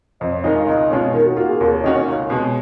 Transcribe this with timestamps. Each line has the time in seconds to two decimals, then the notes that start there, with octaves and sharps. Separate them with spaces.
0.20 F2 D#5
0.33 C#5
0.44 D#3 G#3 D#4 A#4 D#5
0.56 F5
0.67 C#2 D#5
0.90 B2 G#3 C#4 F4 C#5
1.13 D#3 A#4
1.26 F#4
1.37 A#3 F4 F#4
1.49 G#4
1.60 D#2 A#4
1.72 C#5
1.83 D#3 A#3 C#4 F#4 D#5
1.95 C#5
2.08 C#2
2.30 B2 G#3